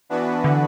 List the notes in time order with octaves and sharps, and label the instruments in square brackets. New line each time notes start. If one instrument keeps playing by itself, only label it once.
[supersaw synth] E3 B3 D4 F#4 B4
[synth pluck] D3